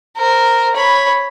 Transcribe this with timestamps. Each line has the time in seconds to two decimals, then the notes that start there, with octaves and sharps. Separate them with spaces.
0.17 A#4 C5
0.74 C#5 B5